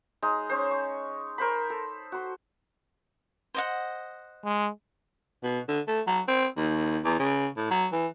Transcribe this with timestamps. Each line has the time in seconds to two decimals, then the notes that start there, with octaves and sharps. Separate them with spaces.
0.22 G#3 D#4
0.49 C#4 C5
0.71 C#6
1.38 A#4 C5 B5
1.70 A4
2.12 F#4 C6
3.55 C5 D#5 F#5
4.44 G#3
5.43 B2
5.68 D3
5.88 A3
6.07 F#3
6.28 C4
6.57 D#2
7.04 E2
7.20 C#3
7.57 A2
7.71 F#3
7.92 E3